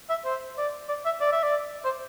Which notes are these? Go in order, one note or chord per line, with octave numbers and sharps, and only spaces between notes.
E5
C5
D5
D5
E5
D5
E5
D5
C5